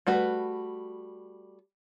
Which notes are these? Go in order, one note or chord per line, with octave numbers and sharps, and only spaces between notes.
G3 A3 F#4 B4